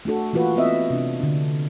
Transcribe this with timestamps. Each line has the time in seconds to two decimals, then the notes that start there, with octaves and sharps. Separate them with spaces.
0.05 A3 D4 F#4 A4
0.33 E3 A#3 F4 F#4 B4
0.57 B3 C4 D#5 E5
0.90 C3 D4
1.20 D3 D4